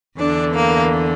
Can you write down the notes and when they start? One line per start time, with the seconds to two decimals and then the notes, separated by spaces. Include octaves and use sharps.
0.19 E2 D3 D4
0.55 A#3